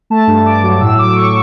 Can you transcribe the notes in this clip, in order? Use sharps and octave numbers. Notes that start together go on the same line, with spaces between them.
A3 A5
G2
G2 D6
F#3
A2 E6
A2 D6
A2 C#6